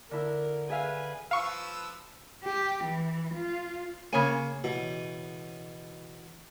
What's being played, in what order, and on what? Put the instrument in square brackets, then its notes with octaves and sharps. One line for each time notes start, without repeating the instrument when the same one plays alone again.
[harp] D3 E4 [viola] A#4
[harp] G#4 E5 F5 [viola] B4 G#5
[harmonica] F3 B4 E6 [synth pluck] F5 C#6
[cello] G4
E3
F4
[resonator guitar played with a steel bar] C#3 C#5 G#5 [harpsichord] A#3
[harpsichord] B2 E3